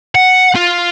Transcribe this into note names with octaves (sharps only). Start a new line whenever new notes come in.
F#5
F4